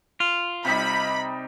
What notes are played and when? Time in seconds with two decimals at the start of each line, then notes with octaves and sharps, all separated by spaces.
0.20 F4
0.65 C3 G3 D#4 B5